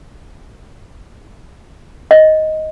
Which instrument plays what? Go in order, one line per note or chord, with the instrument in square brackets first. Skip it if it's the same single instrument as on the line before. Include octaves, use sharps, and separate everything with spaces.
[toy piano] D#5